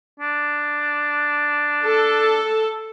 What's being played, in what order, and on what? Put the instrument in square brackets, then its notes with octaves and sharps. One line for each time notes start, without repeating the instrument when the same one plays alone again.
[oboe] D4
[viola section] A4